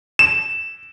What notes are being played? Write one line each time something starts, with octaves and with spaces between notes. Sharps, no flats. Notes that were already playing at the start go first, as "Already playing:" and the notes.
E7